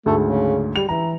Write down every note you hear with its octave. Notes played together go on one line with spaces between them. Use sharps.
D2 G#2 A3
C#3
G3 F7
E3 A#5